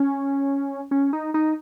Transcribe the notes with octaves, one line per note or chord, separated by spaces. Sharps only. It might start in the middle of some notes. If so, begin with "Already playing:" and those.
Already playing: C#4
C#4
D#4
D#4